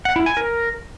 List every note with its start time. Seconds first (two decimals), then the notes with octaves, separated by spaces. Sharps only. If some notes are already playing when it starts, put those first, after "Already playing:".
0.05 F#5
0.16 E4
0.26 G#5
0.37 A#4